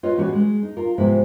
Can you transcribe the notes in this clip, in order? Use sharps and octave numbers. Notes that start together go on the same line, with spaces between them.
F4 B4 C#5 D#5
A2 E3 C#4 F#4 G#4 D5
G#3
D#4
F4 A#4
G#2 C3 F3 B3 C4 E4